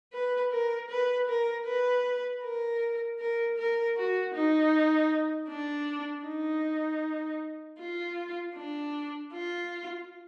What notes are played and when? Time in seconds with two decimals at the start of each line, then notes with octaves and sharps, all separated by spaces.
0.13 B4
0.52 A#4
0.90 B4
1.29 A#4
1.66 B4
2.43 A#4
3.19 A#4
3.58 A#4
3.96 F#4
4.34 D#4
5.49 D4
6.25 D#4
7.79 F4
8.56 D4
9.32 F4